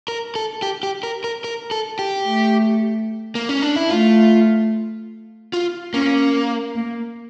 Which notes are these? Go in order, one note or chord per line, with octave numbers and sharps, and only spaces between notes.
A#4
A4
G4
G4
A#4
A#4
A#4
A4
G4
A3
A#3
C#4
D4
E4
A3 F4
F4
A#3 C#4
A#3